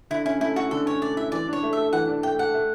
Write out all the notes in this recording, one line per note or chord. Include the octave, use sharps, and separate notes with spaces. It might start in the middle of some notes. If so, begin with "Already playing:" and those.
D3 E4
C#4 E4
A3 E4
E4 F#4
D3 A4
C#4 C#5
A3 D5
E4 E5
E3 D5
D4 C#5
A3
A4 E5
E3 F#5
D4
A3 G5
A4 F#5
A3